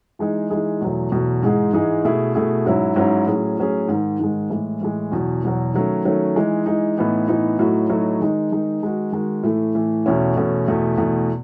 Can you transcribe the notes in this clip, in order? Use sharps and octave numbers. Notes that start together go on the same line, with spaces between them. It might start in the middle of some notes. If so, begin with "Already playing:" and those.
E3 G#3 D#4 G#4
E3 G#3 D#4 G#4
E2 B2 F#3 A3
E2 B2 F#3 A3
G#2 E3 G#3 D#4 G#4
G#2 E3 G#3 D#4 G#4
B2 A3 E4 G#4
B2 A3 E4 G#4
G#2 F#3 C#4 E4
G#2 F#3 C#4 E4
A2 F#3 C#4 G#4
A2 F#3 C#4 G#4
G#2 D#3 G#3
G#2 D#3 G#3
A2 E3 G#3
A2 E3 G#3
E2 B2 F#3
E2 B2 F#3
D#3 F#3 A3 C#4
D#3 F#3 A3 C#4
E3 G#3 D#4
E3 G#3 D#4
A2 E3 B3 D#4
A2 E3 B3 D#4
A2 F#3 A3 D#4 F#4
A2 F#3 A3 D#4 F#4
D#3 G#3 D#4
D#3 G#3 D#4
D#3 G#3 D#4 F#4
D#3 G#3 D#4 F#4
A2 E3 A3
A2 E3 A3
E2 B2 A3 C#4 E4
E2 B2 A3 C#4 E4
E2 B2 A3
E2 B2 A3